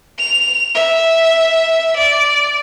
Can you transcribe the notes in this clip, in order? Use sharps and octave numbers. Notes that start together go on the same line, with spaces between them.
F7
E5
D5